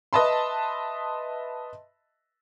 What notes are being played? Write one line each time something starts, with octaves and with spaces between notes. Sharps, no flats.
B4 D#5 E5 A5 B5 C6